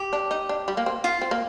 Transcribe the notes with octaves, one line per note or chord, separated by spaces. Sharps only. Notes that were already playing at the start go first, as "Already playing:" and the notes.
Already playing: G4
D4
D#4
D4
G3
A#3
C4
F4
C4
A#3